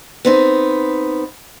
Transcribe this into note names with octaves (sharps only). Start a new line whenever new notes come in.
B3 C4 D#4